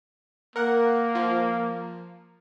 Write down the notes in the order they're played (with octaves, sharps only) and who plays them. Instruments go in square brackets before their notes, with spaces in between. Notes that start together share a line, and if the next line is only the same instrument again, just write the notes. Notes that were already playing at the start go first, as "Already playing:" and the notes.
[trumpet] A#3 [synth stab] A#4 F#5
[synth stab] F3